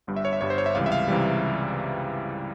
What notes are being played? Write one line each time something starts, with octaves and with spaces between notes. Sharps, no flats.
G1 G2 G3
E5
C#5
E5
G1 G2 G3 C#5
C5
C#5
E5
C#2 C3 E3 G3 F5
E5
F5
C#2 C3 E3 G3